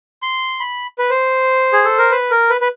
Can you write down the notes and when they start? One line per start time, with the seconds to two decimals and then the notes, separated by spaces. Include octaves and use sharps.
0.22 C6
0.60 B5
0.98 B4
1.10 C5
1.73 G#4
1.85 A4
1.98 A#4
2.11 B4
2.31 A#4
2.50 B4
2.61 B4